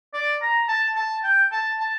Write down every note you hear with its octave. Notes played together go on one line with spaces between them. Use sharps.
D5
A#5
A5
A5
G5
A5
A5